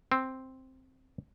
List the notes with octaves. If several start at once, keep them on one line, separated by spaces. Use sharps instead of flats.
C4